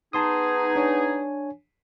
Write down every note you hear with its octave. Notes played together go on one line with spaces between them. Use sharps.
B3 D#4 G#4 A5 C6 D#6
D4 C#5 G#5